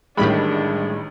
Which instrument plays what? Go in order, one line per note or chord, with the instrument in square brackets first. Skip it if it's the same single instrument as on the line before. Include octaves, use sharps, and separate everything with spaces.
[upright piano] A1 D#3 [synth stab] A2 G3 B5 [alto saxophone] G#3 [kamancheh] D4